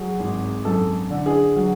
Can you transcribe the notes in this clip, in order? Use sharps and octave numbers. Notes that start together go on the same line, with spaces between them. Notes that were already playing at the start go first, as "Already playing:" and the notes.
Already playing: F#3 G#4
G#1
F#2 A4
D3
G#4
F#3